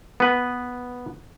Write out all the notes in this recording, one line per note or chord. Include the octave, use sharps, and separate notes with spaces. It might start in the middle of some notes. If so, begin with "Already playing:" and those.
B3 B4